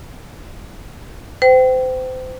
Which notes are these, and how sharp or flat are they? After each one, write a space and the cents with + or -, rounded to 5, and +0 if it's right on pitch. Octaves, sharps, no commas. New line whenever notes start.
C5 -30 G5 -25